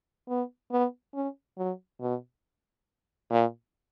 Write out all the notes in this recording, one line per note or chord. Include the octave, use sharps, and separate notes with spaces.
B3
B3
C#4
F#3
B2
A#2